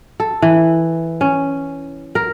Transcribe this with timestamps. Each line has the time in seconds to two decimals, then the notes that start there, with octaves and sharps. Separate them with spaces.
0.20 A4
0.42 E3
1.21 C#4
2.15 A#4